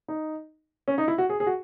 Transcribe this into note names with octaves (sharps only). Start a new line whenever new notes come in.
D#4
C#4
D#4
E4
F#4
G#4
G#4
F#4